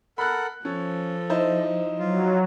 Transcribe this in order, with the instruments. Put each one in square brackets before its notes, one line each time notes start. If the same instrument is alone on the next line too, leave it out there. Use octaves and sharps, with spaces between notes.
[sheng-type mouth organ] A4 A#4 F#5 [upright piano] B5 F#6
[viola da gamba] F3 [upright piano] C#4 [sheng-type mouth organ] A4
[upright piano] D#4 E4 C5
[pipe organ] F#3 [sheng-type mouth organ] F4